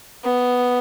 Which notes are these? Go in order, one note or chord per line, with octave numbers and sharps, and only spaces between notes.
B3